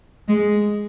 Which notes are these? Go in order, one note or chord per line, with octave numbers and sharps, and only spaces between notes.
G#3